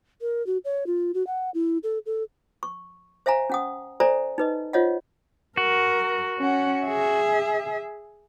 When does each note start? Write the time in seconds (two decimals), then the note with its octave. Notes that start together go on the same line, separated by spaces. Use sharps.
0.21 A#4
0.46 F#4
0.65 C#5
0.86 F4
1.14 F#4
1.27 F#5
1.54 E4
1.83 A4
2.06 A4
2.63 C#6
3.26 C5 E5 F5 G#5 A#5
3.50 C#4 F#5 D#6
4.00 A4 C5 D5 E5 G#5 A#5
4.38 D#4 B4 D#5
4.73 F4 C5 C#5 D#5 F5 F#5
5.57 F#4 A#4
6.40 C#4 F#5
6.85 G#4 E5